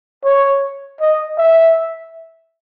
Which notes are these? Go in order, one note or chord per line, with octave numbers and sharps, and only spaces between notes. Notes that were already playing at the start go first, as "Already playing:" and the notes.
C#5
D#5
E5